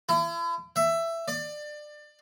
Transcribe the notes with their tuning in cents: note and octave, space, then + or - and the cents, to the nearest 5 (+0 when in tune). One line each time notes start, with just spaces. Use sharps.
E4 +40
E5 +15
D5 +25